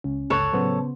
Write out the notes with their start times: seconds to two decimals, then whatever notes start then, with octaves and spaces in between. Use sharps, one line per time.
0.04 C#2 C#4
0.30 G1 C#2 A4 C#5 F#6
0.53 A2 C#3 F#3 B3 C5